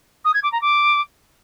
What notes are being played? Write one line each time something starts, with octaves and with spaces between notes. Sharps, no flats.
D#6
G#6
D6
A#5
D6